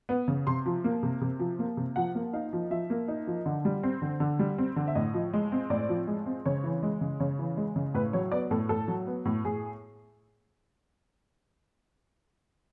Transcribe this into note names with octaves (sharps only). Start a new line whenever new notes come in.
B3
C#3
C3 C6
F3
A#3
C3
C3
F3
A#3
C3
F3 F#5
A#3
D#4 F5
F3
F3 E5
A#3
D#4
F3
D3
G3
C4
D3
D3
G3
C4
D3
E5
A2 D#5
F3
G#3
C4
A2 D5
F3
G#3
C4
C#3 C#5
E3
G#3
C#3
C#3 C#5
E3
G#3
C#3
A2 B4
F#3 C#5
B3 D5
A2 A4
A2 A4
F#3
B3
A2
A2 G#4